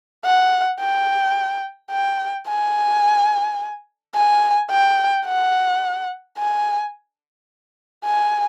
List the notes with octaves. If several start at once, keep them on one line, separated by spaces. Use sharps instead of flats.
F#5
G5
G5
G#5
G#5
G5
F#5
G#5
G#5